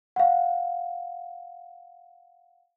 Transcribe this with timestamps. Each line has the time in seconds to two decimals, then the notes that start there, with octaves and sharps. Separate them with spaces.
0.16 F5 F#5